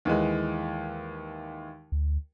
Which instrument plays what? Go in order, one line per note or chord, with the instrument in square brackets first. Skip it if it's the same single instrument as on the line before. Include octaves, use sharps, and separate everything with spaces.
[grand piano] D#2 E3 G#3
[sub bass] D2